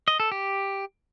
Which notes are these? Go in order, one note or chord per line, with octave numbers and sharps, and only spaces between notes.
D#5
A4
G4